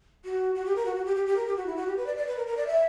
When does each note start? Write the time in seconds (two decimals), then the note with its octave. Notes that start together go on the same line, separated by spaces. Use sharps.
0.25 F#4
0.55 F#4
0.66 G4
0.76 A#4
0.86 F#4
0.96 F#4
1.05 G4
1.16 G4
1.26 G4
1.36 A#4
1.46 G4
1.56 F#4
1.66 E4
1.76 F#4
1.87 G4
1.97 B4
2.06 D5
2.17 D5
2.27 B4
2.37 A#4
2.47 A#4
2.57 D5
2.67 E5